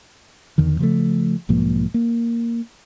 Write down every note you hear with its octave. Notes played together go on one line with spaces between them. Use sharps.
E2 D3 D#3
C#3 F3 F#3 A3
B1 G#2 F3 A#3
A#3